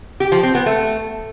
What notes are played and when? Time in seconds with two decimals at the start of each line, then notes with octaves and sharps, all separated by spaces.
0.20 G4
0.32 F3
0.43 C4
0.55 B3
0.66 A3